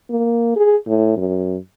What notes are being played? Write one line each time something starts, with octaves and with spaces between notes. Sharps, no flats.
A#3
G#4
A2
F#2